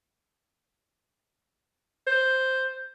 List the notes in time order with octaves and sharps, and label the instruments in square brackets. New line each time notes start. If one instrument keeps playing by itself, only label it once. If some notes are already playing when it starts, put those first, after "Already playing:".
[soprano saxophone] C5